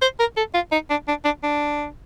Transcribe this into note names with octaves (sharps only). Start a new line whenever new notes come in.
C5
A#4
A4
F4
D#4
D4
D4
D4
D4